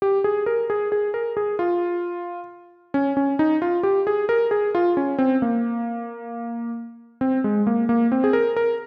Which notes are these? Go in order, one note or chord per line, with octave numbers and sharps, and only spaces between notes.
G4
G#4
A#4
G#4
G#4
A#4
G#4
F4
C#4
C#4
D#4
F4
G4
G#4
A#4
G#4
F4
C#4
C4
A#3
C4
G#3
A#3
A#3
C4
G#4
A#4
A#4